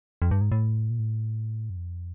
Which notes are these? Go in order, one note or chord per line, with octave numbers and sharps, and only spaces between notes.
F2
G2
G#2
A2
A#2
A2
F#2
F2